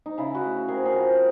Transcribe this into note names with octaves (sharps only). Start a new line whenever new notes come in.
D#4
C#3 E4
E4 F#4
A3
C4 G#4 A#4
G#4 A#4
F3